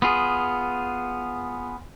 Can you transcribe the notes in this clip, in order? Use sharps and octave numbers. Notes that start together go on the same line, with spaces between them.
B3 F4 G#4